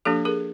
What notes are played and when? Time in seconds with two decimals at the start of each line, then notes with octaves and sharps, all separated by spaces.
0.05 F3 A#3 D4 G4 A4
0.25 G#4 A#4